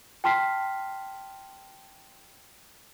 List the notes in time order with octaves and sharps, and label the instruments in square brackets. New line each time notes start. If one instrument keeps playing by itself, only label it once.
[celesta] G5 A5 C6 F6 B6 C7